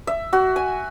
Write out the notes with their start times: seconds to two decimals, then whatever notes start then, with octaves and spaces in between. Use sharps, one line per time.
0.07 E5
0.33 F#4
0.56 G#5